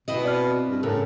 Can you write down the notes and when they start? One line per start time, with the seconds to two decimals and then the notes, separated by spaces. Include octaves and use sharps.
0.08 B2 C4 E4 D#5
0.25 D5 F6
0.70 G2
0.83 A2 C#3 A4 A#4